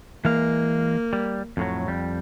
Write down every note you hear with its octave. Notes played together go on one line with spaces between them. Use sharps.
E3 G#3 A#3 F5
G3
F2 A2 F#3
F2 G3